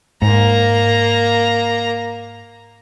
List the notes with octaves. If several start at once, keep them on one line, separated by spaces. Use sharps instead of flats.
G#2 A#3 A#5